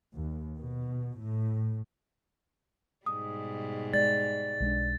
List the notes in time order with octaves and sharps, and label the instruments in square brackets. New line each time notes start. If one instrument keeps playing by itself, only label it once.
[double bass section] D#2
B2
A2
[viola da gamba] G#2 B2 G3 [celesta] D#6
[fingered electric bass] G#3 [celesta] D5 [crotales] A6
[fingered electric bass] B1 G#3 D4